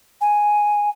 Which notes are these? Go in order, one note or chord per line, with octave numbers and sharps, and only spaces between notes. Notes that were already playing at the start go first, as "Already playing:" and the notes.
G#5